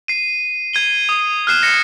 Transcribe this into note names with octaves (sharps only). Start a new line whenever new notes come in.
C7 D#7
G#6 D#7 G7
D#6
F6 F#6 C7 E7
A#6 C#7